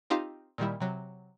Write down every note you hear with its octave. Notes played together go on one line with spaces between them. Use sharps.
C4 D#4 F4 G4 C5 F5
A#2 D#3 G3 E4
C3 F#3